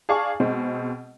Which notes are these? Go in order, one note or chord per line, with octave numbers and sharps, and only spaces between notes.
G#4 D5 F5 A5 C#6
B2 G#3 C4